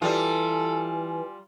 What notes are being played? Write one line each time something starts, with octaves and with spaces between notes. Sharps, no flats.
E3 G3 F4 A4 G#5